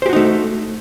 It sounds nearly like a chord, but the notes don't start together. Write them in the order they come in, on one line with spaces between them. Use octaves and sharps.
C5 G4 F#4 D#4 A3